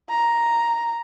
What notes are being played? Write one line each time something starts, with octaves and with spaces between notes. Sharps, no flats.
A#5